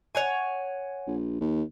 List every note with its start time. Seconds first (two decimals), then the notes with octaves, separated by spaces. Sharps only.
0.15 C#5 F#5 G#5
1.07 A#1
1.41 D#2